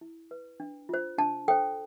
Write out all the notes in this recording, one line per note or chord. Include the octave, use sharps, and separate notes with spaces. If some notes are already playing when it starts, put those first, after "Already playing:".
E4
B4
D4
F4 C5
D4 A5
A4 C5 G5